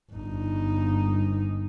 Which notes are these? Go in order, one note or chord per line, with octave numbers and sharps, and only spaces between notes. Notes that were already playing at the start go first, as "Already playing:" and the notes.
G1 D#4